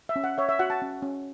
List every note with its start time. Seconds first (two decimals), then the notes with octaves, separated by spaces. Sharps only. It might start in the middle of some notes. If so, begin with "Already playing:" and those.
0.09 E5
0.16 C#4
0.24 F#5
0.38 C#5 E5
0.49 E5
0.59 F#4 F#5
0.70 A5
0.82 C#4
1.02 C#4